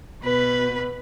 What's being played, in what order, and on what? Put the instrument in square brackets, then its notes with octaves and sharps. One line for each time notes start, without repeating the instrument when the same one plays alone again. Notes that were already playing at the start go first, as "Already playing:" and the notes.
[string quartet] B2 B4 B5